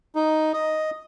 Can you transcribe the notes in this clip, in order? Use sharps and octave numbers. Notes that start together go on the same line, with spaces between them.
D#4
D#5